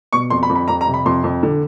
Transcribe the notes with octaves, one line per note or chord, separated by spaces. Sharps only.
B2 C#6
F2 C6
B5
F2
B5
F2 A#5
A#5
C3
B5
F2 C6
F2
D3